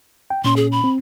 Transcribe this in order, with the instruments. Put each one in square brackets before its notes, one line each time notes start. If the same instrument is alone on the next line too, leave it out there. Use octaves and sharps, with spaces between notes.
[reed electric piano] G5
[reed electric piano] A#2 C#4 [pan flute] C6
[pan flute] G#4
B5
[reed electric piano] C4